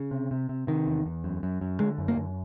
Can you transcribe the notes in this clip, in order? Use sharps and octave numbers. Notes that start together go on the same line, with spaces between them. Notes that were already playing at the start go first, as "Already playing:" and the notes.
Already playing: C#3
C3
C3
C3
C3 D#3
E2
E2
F#2
F#2
F#2
D3 G#3
F#2
A#3
F#2